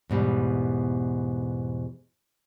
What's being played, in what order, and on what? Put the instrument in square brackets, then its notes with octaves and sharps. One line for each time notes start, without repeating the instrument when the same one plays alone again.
[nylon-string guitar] E2 G#2 B2 G3